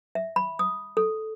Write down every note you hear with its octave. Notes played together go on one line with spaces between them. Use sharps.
E5
B5
D#6
A4